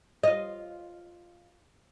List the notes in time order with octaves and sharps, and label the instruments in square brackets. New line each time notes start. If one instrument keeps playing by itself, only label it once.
[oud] F4 D#5